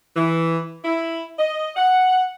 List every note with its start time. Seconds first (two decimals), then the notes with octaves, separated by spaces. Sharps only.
0.15 E3
0.85 E4
1.38 D#5
1.76 F#5